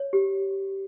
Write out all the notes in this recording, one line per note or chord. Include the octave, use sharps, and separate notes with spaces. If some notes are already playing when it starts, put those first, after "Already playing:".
Already playing: C#5
G4